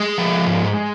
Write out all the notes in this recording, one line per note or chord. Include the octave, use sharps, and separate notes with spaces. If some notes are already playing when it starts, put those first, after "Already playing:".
Already playing: G#3 G#4
F3
G#2